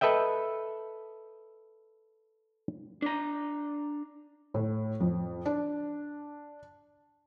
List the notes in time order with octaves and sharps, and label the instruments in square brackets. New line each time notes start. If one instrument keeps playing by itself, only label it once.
[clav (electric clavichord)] A4 B4 D#5 E5 G5
[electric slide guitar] D4 A#5
[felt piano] A2
F2
D4